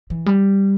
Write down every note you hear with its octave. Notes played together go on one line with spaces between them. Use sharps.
E3
G3